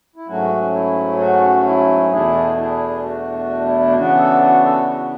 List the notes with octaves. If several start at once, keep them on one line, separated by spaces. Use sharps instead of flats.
E4
G#2 F#3 A3 C#4 F#4
E4
F#4
E4
E2 B2 A3 D4 E4 G#4
E4 G#4
F#4
F#4
E4
C#3 E3 B3 D4 F#4
F#4 A4
F#4
F#4 A4
F#4